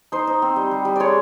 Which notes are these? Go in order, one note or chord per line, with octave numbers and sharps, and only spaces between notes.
D#4 C5
D#4
C4
G3
G3
G3
G#3 C#5 D5